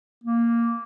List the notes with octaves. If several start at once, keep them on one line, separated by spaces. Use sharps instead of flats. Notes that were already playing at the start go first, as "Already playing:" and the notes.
A#3